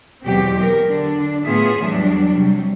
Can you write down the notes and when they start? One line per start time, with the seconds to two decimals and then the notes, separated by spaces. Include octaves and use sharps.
0.24 E2 B2 F#3 C4 G4
0.58 F#3 G4 A#4
0.89 D3 D4
1.46 A2 B3 F4 G#4 E5
1.81 E2 F#3 G3 D4
2.33 C3 F#3 G3